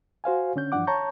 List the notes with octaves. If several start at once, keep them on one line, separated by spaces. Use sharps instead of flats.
F#4 C5 F5 G#5
D3 C#4 G6
G2 E3 F3 D4 F#5 D6
C#5 A5 A#5 C#6 G6